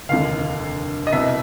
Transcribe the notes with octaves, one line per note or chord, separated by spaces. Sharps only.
F1 D#2 D3 F5
D#5
C2 B2 E5